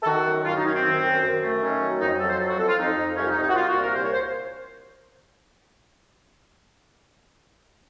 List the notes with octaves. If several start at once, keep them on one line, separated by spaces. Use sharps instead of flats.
A4
D#3 F#4
F#2
F#2 F4
D#4
D#3 C#4
C4
D#3
F#2
F#2
A3
D#3 C#4
F#3
F2 D#4
F#3 A4
C5
F2 A4
F#4
F2 A4
F4
F2 D#4
F2
C2 C#4
F4
D#4
C2
D#4
F#4
C2 F4
F#4
A#2
A#4
C2 C5
C#5
C5